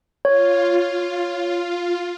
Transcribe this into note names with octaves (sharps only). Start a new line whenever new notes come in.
F4 C#5